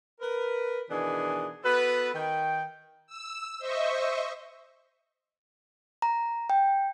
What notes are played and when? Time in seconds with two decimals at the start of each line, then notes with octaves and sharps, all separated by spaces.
0.21 A#4 B4
0.90 B2 D#3 E3 D4 G#4
1.64 B3 F#4 A4 B4
2.14 D#3 G5
3.06 E6
3.58 C5 D#5 E5 C#6
6.02 A#5
6.50 G5